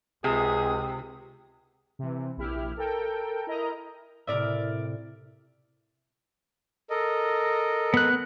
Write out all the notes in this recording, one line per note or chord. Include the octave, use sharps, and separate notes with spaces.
C#2 C3 G#4 D#6
C3 E3
A#1 E4 G4 F6
A4 A#4 G5
E4 A#4 D#5 A#5
A2 C3 A#4 D5 E5
A4 A#4 D#5
B3 F#6